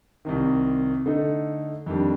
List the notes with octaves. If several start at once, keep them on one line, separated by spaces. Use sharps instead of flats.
C2 C3 D#3
D3 A3 D#4
F2 D#3 G3 D4